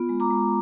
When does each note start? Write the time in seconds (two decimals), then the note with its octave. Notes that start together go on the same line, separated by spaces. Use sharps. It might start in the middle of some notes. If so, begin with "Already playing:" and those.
Already playing: B3 F4
0.09 G#3
0.20 A#5 D6
0.30 G#3